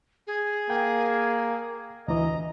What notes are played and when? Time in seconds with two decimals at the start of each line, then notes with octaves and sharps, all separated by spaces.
0.27 G#4
0.70 A#3 G5
2.08 D2 E3 D#5 A#5